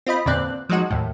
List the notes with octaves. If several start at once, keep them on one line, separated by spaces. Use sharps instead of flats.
C4 F4 D#5 B5
E2 A#2 D3 C4 D5 F#6
F3 F#3 G#3 D#4 F#4
D#2 A2